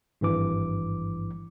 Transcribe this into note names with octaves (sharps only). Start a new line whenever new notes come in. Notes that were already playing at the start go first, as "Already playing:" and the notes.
G#1 G2 E3 D6